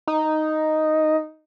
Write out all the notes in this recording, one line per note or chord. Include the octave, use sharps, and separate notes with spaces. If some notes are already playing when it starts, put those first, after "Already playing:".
D#4